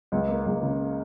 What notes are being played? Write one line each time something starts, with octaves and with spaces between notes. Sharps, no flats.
C#2
A#3
C#2
C#3